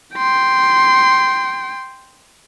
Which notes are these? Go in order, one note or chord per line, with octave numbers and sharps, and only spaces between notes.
G5 C6